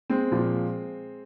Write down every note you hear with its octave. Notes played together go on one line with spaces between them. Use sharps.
G#3 C4
A#2 F3